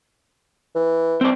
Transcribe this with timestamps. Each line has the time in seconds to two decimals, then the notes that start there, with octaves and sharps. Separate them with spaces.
0.75 E3
1.21 C4 D5